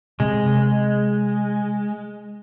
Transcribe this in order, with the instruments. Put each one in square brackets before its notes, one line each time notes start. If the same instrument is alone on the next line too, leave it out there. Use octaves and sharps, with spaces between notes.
[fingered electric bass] C3 [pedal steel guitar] G#3